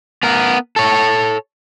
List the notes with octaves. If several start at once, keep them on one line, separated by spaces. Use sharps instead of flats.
B3 A#4
A4 C#5